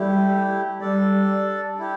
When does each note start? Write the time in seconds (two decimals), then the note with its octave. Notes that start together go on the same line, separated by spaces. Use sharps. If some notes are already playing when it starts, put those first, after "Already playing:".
Already playing: G3 A3 E4 G4
0.80 G3 D4 A4 D5
1.79 E4 G4